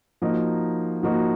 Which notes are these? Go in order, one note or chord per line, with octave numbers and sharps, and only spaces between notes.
F3 A#3 D#4 F#4
F3 A#3 D#4 F#4